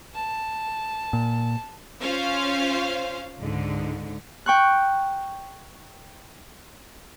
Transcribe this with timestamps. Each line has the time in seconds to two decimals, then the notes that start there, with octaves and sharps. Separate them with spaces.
0.14 A5
1.13 A#2
2.02 C#4 F4 C5 F5
3.41 C#2 G#2 D3
4.46 G5 C#6 F#6